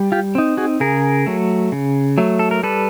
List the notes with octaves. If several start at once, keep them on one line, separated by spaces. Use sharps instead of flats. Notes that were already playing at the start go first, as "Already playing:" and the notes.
Already playing: G3
F4 G4
C4 D#4
F#4 G#4
C#3 G#4 A#4
F#3 A3
C#3
F#3 A3
A4
A#4
G3 A4 B4